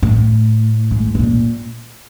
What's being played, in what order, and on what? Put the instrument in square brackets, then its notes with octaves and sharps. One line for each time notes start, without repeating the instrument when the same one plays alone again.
[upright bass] A2
G#2
B2
A#2